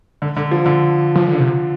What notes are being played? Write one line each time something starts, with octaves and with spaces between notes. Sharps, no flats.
D3
D3
F3
D3
F3
D3
C3